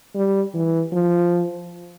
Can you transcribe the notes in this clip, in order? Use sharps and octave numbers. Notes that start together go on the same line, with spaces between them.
G3
E3
F3